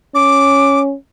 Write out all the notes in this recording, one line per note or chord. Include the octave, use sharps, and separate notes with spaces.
C#4 D6